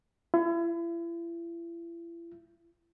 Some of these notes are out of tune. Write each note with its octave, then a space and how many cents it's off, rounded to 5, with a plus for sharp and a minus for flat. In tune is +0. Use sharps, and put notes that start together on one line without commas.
E4 +40